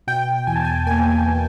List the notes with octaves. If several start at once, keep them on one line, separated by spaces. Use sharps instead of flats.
B2 G5
E2 G#5
A5
G#5
A#3 G#5
B2